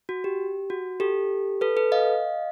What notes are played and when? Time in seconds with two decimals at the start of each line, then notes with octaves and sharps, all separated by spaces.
0.09 F#4
0.24 G4
0.70 F#4
1.00 G4 A4
1.61 A4 B4
1.77 A4 B4
1.92 D#5 F5